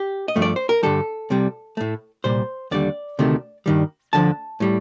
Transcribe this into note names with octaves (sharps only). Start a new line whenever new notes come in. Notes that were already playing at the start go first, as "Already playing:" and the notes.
Already playing: G4
D#5
G2 F3 A3
D5
C5
A#4
G2 D3 G3 A4
C2 C3 G3
A2 A3
C2 A#2 G3 C5
D#2 D3 G3 D5
D2 C3 D#3 A3
G2 D#3 G3
D2 D3 F3 A5
A2 G3